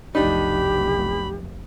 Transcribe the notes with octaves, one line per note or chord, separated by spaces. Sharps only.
F1 B1 D4 D#4 G4 B5